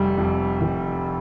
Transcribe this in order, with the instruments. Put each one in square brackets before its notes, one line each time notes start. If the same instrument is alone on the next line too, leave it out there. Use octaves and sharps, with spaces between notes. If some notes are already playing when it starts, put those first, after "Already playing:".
Already playing: [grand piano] F1 [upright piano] G3
[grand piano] F2
F1